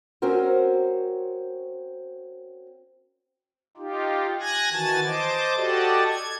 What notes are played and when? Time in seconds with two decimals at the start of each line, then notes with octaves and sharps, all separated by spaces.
0.22 C4 C#4 F#4 A#4 C5
3.77 D#4 F4 G4
4.40 G#5 F#6 G#6 A#6
4.72 D#3 E3 F#4 G#5 A5 A6
5.06 C5 D#5 A5 D6
5.55 F#4 G4 A4 D5 D#5 A5
6.08 G#6